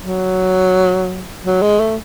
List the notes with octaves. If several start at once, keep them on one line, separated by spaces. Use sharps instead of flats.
F#3
F#3
G#3
A3